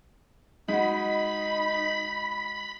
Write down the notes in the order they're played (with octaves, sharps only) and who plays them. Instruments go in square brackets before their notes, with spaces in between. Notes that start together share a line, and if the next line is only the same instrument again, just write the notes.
[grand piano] G#3 F#4 [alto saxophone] D#4 [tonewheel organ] B5